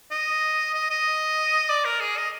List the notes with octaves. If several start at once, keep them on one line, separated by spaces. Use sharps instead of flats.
D#5
D#5
D#5
D5
A#4
G#4
D#5